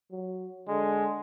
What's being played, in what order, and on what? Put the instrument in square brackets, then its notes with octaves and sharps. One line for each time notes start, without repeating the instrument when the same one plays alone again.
[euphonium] F#3
[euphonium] D3 [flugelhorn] G#3